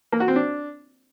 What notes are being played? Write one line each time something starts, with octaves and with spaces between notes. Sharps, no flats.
A#3
F#4
C4
D4